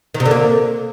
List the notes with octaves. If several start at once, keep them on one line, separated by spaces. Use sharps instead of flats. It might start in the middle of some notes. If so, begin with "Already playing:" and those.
D#3
C3
D3
A#3